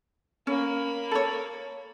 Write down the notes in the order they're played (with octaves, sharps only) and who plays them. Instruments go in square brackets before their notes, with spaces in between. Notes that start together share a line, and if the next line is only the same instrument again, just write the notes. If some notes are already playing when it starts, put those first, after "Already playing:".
[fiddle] A#3 B5 [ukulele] C#4
[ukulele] A4 C#5